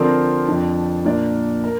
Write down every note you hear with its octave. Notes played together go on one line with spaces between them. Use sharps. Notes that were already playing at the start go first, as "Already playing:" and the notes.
Already playing: D3 F3 C4 A#4 D5
F2 F3 D4
A#2 A#3 D4 A#4 D5
A#4